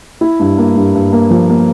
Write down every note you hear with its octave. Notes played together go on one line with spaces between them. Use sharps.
E4
G2
A#3
G2
G2
A#3
F3
A#3